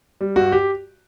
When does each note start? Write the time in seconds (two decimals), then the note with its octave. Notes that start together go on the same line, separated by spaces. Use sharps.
0.21 G3
0.36 G2 F#4
0.52 G4